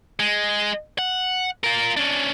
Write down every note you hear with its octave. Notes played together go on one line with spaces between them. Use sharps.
G#3
F#5
F4 A#4
C#4 D4